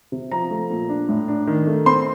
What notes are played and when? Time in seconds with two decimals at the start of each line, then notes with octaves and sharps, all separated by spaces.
0.12 C3
0.32 F3 A#5
0.51 A3
0.70 A#2
0.89 D4
1.09 A2
1.28 D4
1.47 D#3
1.67 A3
1.86 C4 C6